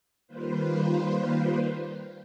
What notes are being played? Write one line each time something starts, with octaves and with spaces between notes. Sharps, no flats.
D#3 G3 A#3 F4 B4 C5